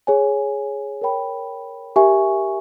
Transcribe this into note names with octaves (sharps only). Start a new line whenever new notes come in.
G#4 C#5 G#5
A#4 C#5 G5 B5
G4 A#4 E5 G#5 C#6